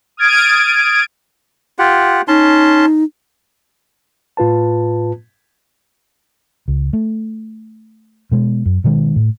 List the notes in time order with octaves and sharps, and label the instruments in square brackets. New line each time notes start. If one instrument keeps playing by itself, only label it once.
[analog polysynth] D#6 F6 G#6 A6 D7 D#7
[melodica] F4 G4 F#5
[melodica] C#4 A5 C6 [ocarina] D#4
[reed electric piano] A2 F4 B4 A5
[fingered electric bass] C#2
A3
B2 G#3
F#2
B2 D#3 G#3
A2